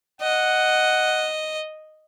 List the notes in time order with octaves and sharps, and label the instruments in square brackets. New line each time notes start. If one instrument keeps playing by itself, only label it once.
[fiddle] D#5 [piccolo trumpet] F#5